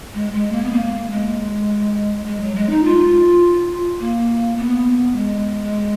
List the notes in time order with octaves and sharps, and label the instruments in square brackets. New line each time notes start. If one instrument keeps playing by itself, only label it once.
[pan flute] G#3
G#3
A#3
B3
A#3
G#3
G#3
F#3
G#3
D#4
F4
A#3
B3
G#3